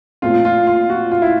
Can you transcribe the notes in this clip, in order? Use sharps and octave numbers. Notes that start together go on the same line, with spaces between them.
A#2 F3 A3 C4 F4
F4
F4
F#4
F4
E4